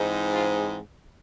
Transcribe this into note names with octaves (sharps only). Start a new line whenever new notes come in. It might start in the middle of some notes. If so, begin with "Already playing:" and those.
Already playing: G#2 E3 G#3 C4 D#4
F4